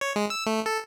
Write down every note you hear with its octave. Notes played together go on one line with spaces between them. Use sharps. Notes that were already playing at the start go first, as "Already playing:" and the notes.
C#5
G#3
E6
A3
A4